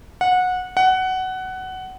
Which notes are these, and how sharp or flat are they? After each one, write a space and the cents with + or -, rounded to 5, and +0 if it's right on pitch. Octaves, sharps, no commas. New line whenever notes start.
F#5 -20
F#5 +15